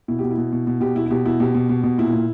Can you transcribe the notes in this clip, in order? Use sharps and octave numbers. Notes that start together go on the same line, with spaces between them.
B2 E4
B2 G4
E4
B2
B2
B2
B2 G4
B2 E4
E4
B2 G4
B2 E4
B2 G4
B2
B2
B2
A#2 E4
A#2